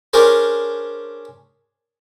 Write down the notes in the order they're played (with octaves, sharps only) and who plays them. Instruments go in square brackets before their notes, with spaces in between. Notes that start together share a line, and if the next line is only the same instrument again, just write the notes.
[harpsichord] C#4 D4 G#4 A#4 C5